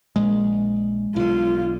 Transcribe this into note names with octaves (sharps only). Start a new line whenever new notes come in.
A#1 G#3
B1 D3 F4